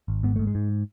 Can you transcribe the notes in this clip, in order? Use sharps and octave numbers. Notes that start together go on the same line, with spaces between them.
G#1
G#2 B3
G#2 A3
G#3
G#2